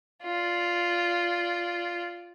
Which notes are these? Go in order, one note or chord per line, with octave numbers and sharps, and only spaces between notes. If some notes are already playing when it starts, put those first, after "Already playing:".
F4 D5